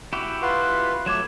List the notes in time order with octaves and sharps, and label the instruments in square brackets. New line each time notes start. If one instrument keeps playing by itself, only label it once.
[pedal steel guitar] E4 F#4 G4
[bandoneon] F4 B4 C6 [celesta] F#5
[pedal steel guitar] F#3 A3 [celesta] D6 G#6 E7